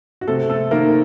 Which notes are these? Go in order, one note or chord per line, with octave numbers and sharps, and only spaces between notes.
F#4
C3 A3 A4
A3 A4
D#3 A#3 A#4